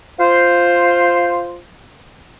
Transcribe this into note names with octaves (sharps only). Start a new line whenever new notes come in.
F4 C5